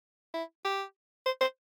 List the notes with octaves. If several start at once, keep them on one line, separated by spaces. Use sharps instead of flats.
E4
G4
C5
C5